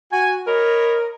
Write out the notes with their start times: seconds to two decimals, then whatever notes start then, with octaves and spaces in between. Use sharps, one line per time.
0.12 F#4 G#5
0.46 A#4 C#5 D#5 B5